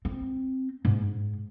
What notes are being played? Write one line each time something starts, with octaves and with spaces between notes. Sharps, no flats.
C4
G#2